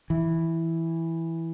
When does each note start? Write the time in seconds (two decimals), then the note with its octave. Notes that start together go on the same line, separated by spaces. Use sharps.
0.10 E3